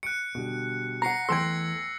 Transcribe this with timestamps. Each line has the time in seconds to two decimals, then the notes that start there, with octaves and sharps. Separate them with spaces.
0.03 F#6 C#7 D7
0.35 B2 D3 G3
1.02 F#5 A#5 A#6 C7 C#7
1.29 E2 A3 G5 A5 C6 E6 G#6